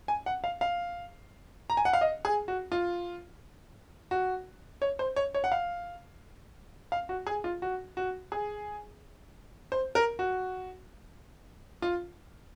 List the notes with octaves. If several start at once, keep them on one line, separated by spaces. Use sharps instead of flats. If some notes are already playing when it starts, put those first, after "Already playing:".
G#5
F#5
F5
F5
A#5
G#5
F#5
F5
D#5
G#4
F#4
F4
F#4
C#5
C5
C#5
C#5
F#5
F5
F5
F#4
G#4
F4
F#4
F#4
G#4
C5
A#4
F#4
F4